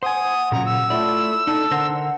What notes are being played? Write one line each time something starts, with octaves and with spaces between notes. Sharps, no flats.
C5 F#5 G#5 D#6
A#2 C#3 F#3 A#5
E6
A3 E4 F4 D5
D4 D#4 A4
D3 A#4 C5 F#5